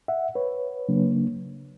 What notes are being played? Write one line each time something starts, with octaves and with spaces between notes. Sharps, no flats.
E5 F#5
B4 C#5
C#3 F#3 A#3 D4